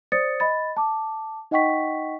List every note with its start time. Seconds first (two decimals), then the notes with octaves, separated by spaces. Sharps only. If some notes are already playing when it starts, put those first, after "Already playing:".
0.12 C5 D5 D#6 A6 C#7
0.40 D#5 B5 A6
0.77 A5 D6
1.51 D#4 D#5 F#5 G5 C#6 B6